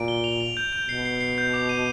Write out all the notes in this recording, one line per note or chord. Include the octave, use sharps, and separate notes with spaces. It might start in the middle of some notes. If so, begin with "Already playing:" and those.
Already playing: A#2 D7
G7
F7
F7
G6
G6
B2 C7
C7
C7
G6
D6
D#7